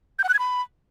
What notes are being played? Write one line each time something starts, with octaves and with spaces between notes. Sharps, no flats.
G6
F#5
F#6
G#6
B5